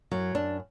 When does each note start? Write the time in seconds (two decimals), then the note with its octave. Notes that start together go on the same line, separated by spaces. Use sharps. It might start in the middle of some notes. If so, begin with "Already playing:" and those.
0.11 F#2 F#3
0.35 F#2 D4